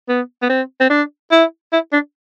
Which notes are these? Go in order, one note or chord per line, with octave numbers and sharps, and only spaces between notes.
B3
B3
C4
C4
D4
E4
E4
D4